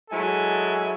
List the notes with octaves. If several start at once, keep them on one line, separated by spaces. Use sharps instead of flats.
F#3 G#3 E4 A4 G#5